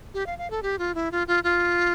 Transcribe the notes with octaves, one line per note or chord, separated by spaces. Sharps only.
G4
F5
F5
A4
G4
F4
E4
F4
F4
F4